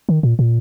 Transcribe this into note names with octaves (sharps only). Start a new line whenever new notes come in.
D#3
A#2
A#2